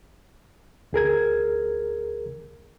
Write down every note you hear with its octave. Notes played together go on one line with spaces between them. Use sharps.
D2 G#4 A#4 G#6